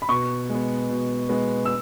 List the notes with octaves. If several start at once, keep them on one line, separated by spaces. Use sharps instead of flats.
B5
B2 C#6
G#3 B3
B2
G#3 B3
E6